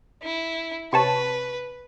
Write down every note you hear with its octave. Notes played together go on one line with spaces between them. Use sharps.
E4
C3 B4 C#5 A5